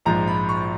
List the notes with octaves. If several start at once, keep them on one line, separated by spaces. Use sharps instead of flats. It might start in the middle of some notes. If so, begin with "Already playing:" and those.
A#1 G#2 F3 A#5
B5
C#6